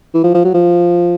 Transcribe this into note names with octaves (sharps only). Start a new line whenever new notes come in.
E3
F3
F3
F#3
F3